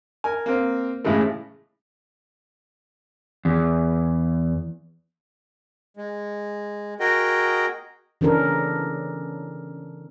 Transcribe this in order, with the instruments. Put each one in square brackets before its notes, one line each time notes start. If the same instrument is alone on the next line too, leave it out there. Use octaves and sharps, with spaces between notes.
[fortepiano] A#4 G#5
A#3 C4
A2 C#3 E3 G#3 A3
[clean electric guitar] E2
[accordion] G#3
F#4 G#4 A#4 D#5 G5
[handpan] C#3 E3 C#4 D4 A4 A#4